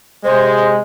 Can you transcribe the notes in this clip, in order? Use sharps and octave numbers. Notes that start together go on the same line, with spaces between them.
C3 G#3 C5